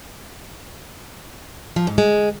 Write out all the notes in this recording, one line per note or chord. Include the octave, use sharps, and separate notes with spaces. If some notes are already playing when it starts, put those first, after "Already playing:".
F3
G#2
G#3